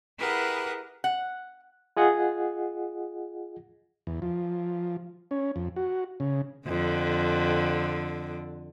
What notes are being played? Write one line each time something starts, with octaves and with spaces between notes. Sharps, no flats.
E4 G4 G#4 A#4 B4 F#5
F#5
F4 G#4 D#5 F#5
E2
F3
C#4
F2
F#4
C#3
F2 D3